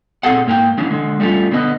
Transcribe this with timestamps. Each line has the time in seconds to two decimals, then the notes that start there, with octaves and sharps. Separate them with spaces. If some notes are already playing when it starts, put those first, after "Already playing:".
0.23 A#2 C4 E4 G#4 A4 F#5
0.46 G#2 A#3 G4 G5
0.78 D#3 E3 C#4 D4
0.91 D3 G#3
1.20 G3 A3 C#4 D#4 F4
1.52 D3 B3 B4 D#5